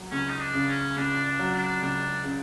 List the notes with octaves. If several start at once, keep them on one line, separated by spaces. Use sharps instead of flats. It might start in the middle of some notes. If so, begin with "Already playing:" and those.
Already playing: F#3
C#2 C#4
D#4
D4
C#3
C#4
C#2 D4
D4
F#3
D4
C#2 D4
C#3